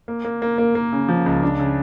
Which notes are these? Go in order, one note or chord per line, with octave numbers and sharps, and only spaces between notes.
A#3
A#3
A#3
A#3
A#3
C#3
F3
C#2
D4
C#3